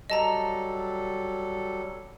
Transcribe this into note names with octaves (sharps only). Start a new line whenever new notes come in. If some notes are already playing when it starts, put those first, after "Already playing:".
F#3 G3 A4 D#5 A5 A#5